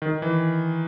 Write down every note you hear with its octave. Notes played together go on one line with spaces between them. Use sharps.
D#3
E3